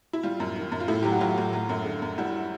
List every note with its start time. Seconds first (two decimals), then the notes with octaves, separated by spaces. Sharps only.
0.13 E4
0.23 G3 F4
0.40 F#2
0.56 D#3
0.72 F#2
0.80 F4
0.88 A2 E4
1.03 F#3 G4
1.12 F#4
1.21 F#3 F4
1.38 A2
1.53 F#3
1.69 F#2
1.86 D3
2.02 F#2
2.18 G3 E4 F#4